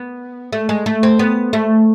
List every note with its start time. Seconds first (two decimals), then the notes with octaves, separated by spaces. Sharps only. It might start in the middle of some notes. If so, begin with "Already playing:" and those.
Already playing: B3
0.53 A3
0.69 G#3
0.86 A3
1.03 C4
1.19 B3
1.53 A3